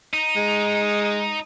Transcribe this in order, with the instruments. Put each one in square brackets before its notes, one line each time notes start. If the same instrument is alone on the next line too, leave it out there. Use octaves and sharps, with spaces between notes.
[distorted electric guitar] D#4
[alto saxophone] G#3